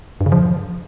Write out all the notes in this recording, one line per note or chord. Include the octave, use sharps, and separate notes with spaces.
G2
C#3
F3